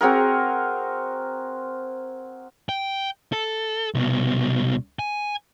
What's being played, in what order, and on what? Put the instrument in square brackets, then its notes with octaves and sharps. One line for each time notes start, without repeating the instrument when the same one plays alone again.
[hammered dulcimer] C4 F#4 G#4 A#4
[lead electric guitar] G5
A4
C2 B2
G#5